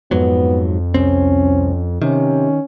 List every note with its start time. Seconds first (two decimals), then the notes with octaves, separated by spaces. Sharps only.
0.11 F2 G#2 F#3 B3
0.94 C2 C4 C#4
2.02 C3 D#3 C#4